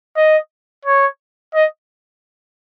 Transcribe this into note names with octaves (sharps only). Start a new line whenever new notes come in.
D#5
C#5
D#5